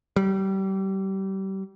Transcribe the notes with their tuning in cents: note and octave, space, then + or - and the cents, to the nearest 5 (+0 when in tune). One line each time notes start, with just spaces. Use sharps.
G3 -30